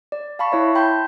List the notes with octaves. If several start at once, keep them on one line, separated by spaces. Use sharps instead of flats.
D5
F5 A5 B5 C#6
E4 C#5 E5
G5 A5 B5 C6 G6